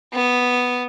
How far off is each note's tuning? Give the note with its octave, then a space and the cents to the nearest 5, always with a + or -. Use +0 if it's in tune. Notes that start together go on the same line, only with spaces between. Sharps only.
B3 +0